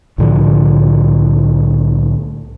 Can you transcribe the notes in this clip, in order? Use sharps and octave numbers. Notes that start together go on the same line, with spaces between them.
C2 A2 D3 F3